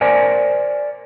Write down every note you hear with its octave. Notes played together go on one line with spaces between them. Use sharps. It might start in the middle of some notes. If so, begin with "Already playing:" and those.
A#4 C5 D5 G#5